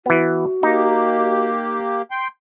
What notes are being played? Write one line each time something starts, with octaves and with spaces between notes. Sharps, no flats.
E3 B3 F#4
A#3 D#4 G4
G5 C6